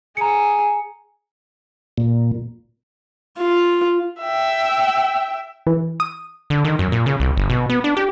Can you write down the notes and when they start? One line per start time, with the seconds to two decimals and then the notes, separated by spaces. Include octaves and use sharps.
0.17 G#4 A#5 C#7
1.98 A#2
3.38 F4
4.20 E5 G5
5.67 E3
6.00 D#6
6.50 D3
6.65 D#3
6.79 F#2
6.92 A#2
7.06 C#3
7.20 C2
7.37 G1
7.50 B2
7.70 B3
7.84 D4
7.97 G4